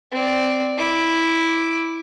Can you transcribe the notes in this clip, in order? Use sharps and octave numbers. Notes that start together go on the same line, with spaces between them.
C4 D5
E4 D6